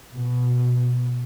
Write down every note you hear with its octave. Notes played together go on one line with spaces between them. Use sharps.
B2